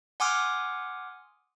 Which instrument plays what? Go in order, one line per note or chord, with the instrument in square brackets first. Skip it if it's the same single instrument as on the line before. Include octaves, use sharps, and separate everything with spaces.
[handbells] F#5 G#5 C6 D6 D#6 F6